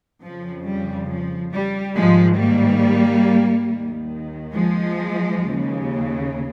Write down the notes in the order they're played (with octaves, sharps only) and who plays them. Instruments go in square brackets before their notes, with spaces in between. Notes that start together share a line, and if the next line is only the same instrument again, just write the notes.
[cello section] F2 C#3 F3
G3
F3
G3
G#2 D#3 F3 G#3
G3 A#3
D#2 D#3
F3 G#3
D#2 C#3